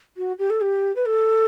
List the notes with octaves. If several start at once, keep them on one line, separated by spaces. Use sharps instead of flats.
F#4
G4
A4
G4
B4
A4